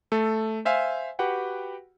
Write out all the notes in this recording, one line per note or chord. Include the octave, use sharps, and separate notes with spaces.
A3 A4
C5 E5 F5 G#5
F#4 G4 B4 F#5 G5